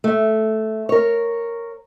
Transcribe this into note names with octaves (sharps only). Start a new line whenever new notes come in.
A3
A#4 C#5